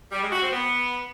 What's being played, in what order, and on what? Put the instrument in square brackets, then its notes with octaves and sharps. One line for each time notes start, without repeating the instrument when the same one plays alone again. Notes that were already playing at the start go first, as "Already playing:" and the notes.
[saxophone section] G3
G#3
F#4
C4
B3